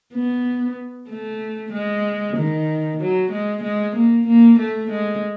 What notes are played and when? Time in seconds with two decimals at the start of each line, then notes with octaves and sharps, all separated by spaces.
0.14 B3
1.09 A3
1.73 G#3
2.37 D#3
3.01 F#3
3.31 G#3
3.63 G#3
3.96 A#3
4.27 A#3
4.59 A3
4.91 G#3